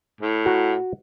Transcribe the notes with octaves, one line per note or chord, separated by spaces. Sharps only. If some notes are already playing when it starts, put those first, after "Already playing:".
A2
F#4 A#5